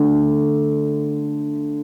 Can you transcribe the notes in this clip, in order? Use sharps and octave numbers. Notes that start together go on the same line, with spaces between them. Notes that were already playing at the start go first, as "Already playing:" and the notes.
Already playing: D3 A3 D4